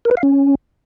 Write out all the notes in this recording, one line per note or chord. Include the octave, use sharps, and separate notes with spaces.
A#4
B4
F5
C#4